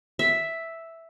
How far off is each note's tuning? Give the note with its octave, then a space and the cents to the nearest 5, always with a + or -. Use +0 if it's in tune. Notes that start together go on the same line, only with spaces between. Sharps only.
E5 +0